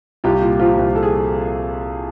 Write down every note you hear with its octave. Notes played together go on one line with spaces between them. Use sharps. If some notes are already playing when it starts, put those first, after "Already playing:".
C2 F4 G4
A#2
F3 F4 G4
C2
A4
G#4